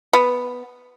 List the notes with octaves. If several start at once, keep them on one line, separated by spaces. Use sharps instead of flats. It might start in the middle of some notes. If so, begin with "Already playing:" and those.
B3